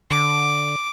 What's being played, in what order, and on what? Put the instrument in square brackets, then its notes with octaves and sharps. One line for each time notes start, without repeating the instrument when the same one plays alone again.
[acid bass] D3 [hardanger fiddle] D6